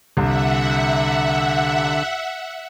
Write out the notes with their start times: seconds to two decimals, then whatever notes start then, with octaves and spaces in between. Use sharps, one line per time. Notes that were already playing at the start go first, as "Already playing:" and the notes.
0.17 C2 D3 E5 F#5